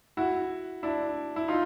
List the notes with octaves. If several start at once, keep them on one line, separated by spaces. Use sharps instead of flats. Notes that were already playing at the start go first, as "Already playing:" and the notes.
E4 F#4
D4 E4
E4
D#4 F4